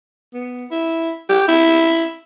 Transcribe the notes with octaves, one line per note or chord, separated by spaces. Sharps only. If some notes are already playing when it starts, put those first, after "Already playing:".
B3
E4
G4
E4